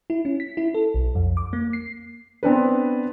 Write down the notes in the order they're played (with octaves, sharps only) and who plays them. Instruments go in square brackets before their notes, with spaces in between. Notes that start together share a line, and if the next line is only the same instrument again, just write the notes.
[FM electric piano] E4
C#4
B6
E4
A4
B1
F2
D6
A#3
C7
[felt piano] B3 C4 D4 B4